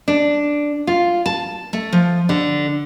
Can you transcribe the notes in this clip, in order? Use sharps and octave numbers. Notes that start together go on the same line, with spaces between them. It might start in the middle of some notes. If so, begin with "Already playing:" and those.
D4
F4
A5
A3
F3
D3